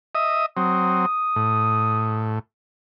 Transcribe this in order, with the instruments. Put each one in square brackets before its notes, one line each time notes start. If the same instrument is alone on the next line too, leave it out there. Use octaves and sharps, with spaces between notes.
[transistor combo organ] D#5 E5 D#6
[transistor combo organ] F#3 C4 [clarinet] D#6
[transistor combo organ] A2